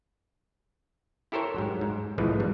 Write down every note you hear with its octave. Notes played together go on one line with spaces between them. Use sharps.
E4 G4 A4 A#4 C5 C#5
G#2 F#3
G#2
C2 A2 E3 F3 G#3
G2 G3